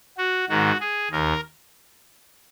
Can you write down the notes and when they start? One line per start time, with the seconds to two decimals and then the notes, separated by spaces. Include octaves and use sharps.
0.18 F#4
0.49 G#2 D#3 F#4
0.80 G#4
1.11 D#2 A#4